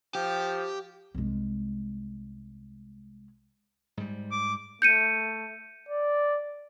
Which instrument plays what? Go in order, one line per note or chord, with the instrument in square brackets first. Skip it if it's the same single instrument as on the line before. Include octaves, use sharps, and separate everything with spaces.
[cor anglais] F3 [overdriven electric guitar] G4
[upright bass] C2 G#3
[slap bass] G#2 G3
[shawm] D6
[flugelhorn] A3 [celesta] G6 C#7 D#7
[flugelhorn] D5